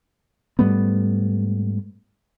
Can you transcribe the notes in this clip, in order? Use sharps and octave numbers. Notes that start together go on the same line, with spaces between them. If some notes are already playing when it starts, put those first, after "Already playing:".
G#2 G3 A3 B3